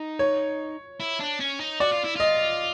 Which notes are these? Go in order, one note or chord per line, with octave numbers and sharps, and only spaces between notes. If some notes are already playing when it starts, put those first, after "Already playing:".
Already playing: D#4
C#5
E4
D4
C#4
D#4
F#4 D5
F4
E4
F4 D#5